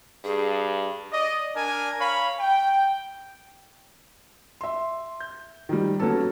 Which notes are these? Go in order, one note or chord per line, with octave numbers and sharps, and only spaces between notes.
G2 G#4
D5 D#5
D4 A#4 G#5
C#5 F5 B5
G5
E5 C6
G6
D#3 F3 G3
F#3 A#3 B3 C#4 A4